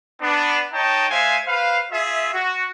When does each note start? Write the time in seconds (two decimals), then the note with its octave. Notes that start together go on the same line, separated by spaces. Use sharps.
0.21 B3 D4
0.73 D#4 C#5 D#5 G5 A5
1.09 G#3 C5 E5 F5 G#5
1.46 B4 C5 F5
1.92 F4 G#4 E5
2.33 F#4